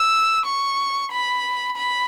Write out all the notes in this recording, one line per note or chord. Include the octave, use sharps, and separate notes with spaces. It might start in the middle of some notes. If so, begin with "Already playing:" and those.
Already playing: E6
C#6
B5
B5